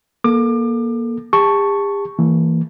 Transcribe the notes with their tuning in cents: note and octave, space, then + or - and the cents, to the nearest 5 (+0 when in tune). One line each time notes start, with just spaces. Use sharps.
A#3 +20 A4 +0 D6 +30
G4 +45 A5 +5 C#6 +0
E3 +0 A#3 -25